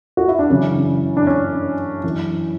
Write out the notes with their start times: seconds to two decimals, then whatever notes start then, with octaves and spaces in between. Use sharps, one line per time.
0.17 F#4
0.28 E4
0.39 D4
0.50 F#2 C#3 E3 C#4
1.17 D4
1.27 C#4
2.04 F#2 E3